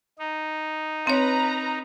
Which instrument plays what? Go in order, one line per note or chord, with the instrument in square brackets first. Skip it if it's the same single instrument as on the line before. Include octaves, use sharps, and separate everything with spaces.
[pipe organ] D#4
[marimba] C4 C#5 [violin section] B4 A#5